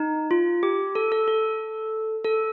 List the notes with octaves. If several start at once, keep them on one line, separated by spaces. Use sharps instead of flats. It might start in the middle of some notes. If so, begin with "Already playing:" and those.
Already playing: D#4
F4
G4
A4
A4
A4
A4